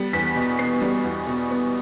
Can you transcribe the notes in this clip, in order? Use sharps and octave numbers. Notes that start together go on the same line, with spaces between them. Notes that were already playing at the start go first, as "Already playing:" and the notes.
Already playing: G3 B3
E2 B6
B2
B3 C7
G3
E2
B2
B3